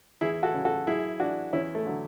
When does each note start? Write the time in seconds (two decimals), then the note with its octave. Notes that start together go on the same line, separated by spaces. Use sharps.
0.21 E2 E4 G#4
0.43 F#4 A4
0.54 C#3 F#3
0.65 F#4 A4
0.87 F#2 E4 G#4
1.20 E3 D4 F#4
1.53 E2 C#4 E4
1.75 A3
1.86 D3 F#3